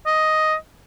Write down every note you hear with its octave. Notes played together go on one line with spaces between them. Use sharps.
D#5